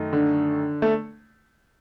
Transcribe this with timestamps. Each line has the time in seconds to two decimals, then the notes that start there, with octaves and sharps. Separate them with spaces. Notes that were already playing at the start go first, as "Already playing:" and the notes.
Already playing: F#2 D#3 A3 D#4
0.13 D3
0.82 A3